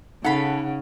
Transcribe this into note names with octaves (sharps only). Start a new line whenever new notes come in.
C#3 D#4 A4 F5 F#5 B5